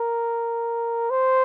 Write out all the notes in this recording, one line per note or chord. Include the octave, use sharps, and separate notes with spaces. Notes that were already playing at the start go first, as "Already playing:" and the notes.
Already playing: A#4
C5